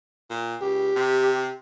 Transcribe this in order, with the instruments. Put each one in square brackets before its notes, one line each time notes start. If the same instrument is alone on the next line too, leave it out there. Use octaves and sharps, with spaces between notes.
[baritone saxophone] A#2
[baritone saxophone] C#2 [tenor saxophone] G4
[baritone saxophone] C3